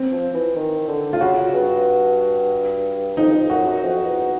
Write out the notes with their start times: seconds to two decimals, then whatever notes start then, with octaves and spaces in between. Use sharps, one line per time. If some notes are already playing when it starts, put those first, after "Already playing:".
Already playing: C4
0.12 F3
0.33 E3
0.56 D#3
0.88 D3
1.13 F4
1.20 C#3 F#4
1.54 G2
3.17 F2 D#4
3.34 F2
3.50 F#2 F#4
3.66 F#2
3.82 F2
4.04 E2